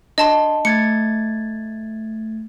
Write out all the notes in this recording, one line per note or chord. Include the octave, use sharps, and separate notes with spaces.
D4 D#5 A5 C6
A3 G#6 A6 C#7